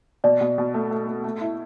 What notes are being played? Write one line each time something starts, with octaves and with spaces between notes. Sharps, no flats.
B2 D5
B2
B2
A3
A3
A3
A3
E4